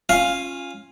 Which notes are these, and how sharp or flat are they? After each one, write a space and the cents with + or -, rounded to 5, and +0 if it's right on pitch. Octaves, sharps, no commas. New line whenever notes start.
C#4 -15 F4 +0 F5 +5